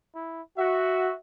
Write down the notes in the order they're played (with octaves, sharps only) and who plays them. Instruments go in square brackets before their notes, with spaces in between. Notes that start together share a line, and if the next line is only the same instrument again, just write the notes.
[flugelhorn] E4
[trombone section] F#4 [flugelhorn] E5